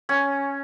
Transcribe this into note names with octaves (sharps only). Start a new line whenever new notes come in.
C#4